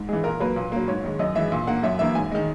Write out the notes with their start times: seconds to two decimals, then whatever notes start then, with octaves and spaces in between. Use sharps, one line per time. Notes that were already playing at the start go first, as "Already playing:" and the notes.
Already playing: G#2
0.08 E3 G#3 G#4
0.24 A#2 A#4
0.40 F#3 A#3 B4
0.56 A#2
0.72 F#3 A#3
0.88 G#2 C#5
1.04 D#3 G#3
1.19 F#2 D#5
1.35 E3 G#3 E5
1.52 A#2
1.67 A#3 F#5
1.83 F#2 E5
1.99 E3 A#3 E5
2.15 G#2 G#5
2.31 D#3 G#3